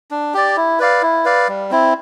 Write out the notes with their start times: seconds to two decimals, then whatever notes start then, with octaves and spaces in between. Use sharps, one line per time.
0.11 D4
0.34 G4 D5
0.57 E4
0.79 B4 D5 F5
1.02 E4
1.25 B4 D5 F5
1.48 G3
1.71 C4 E4